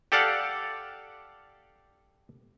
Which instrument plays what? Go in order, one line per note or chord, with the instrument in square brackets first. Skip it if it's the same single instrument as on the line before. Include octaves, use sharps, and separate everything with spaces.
[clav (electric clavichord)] G4 A4 D5 F5 F#5